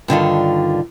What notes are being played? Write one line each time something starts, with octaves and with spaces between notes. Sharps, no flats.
G2 D3 D#3 F4